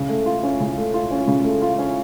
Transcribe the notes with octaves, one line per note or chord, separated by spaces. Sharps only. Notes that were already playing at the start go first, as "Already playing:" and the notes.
Already playing: C#3
A3
F4
C#4
C#3
A3
F4
C#4
C#3
A3
F4
C#4